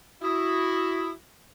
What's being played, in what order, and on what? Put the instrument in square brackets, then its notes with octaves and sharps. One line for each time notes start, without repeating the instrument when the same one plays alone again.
[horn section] E4 [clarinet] F#4 [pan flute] D#6